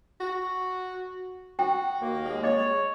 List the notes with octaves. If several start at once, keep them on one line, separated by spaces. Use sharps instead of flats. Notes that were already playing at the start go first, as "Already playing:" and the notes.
F#4
F#4 G5
D#2 A#3
G#3
C#5 D#5